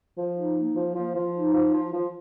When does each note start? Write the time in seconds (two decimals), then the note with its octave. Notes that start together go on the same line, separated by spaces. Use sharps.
0.17 F3
0.36 D#4
0.56 A#3
0.76 F3
0.94 F3
1.15 F3
1.35 D#4
1.53 F3
1.74 F3
1.93 F3